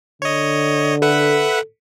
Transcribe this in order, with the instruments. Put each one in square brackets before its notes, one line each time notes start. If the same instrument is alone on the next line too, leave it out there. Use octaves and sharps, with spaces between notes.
[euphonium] D3 [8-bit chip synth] C#5 D#5
[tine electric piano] A4 [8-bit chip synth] B4 E5 F#5